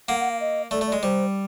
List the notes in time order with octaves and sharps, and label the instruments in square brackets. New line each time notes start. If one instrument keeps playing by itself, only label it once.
[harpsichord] A#3 [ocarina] F#5
[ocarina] F#5
F5
D#5
[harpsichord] A3 [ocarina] D5
[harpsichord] A3
[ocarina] D5
[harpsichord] G#3
[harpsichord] G3 [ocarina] C5